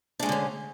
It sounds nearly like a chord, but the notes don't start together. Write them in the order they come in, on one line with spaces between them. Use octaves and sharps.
D4 G#3 A3 D3 C#4